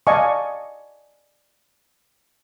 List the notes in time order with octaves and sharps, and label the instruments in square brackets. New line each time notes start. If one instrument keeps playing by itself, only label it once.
[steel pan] D5 D#5 F5 G#5 A5 C#6